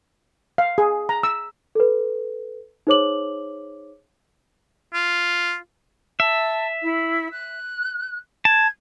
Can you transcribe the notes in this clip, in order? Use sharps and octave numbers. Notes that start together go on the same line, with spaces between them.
F5
G#4
A#5
E6
A4 B4
D#4 G#4 C5 C#5 D6 F#7
F4
E5 A5
E4
F#6
A5 G#6